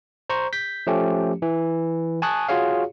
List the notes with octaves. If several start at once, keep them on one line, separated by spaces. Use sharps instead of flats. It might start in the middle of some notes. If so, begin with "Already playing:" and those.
C5 A#5 C#6
G6 B6
F3 A3 C#4 G4
E3
G#5 A5 C#6 D#6 F#6
F4 F#4 G#4 C#5 F5